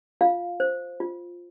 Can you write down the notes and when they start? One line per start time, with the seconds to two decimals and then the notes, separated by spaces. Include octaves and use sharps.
0.21 F4 F5
0.60 C5
1.00 F4